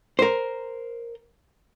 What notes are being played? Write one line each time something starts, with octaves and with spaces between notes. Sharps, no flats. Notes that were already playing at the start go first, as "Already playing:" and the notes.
A#4 C5